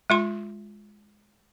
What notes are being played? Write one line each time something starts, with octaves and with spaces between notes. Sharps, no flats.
G#3 F4 C6